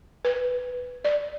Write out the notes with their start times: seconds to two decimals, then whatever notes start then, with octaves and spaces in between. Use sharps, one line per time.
0.25 B4
1.05 D5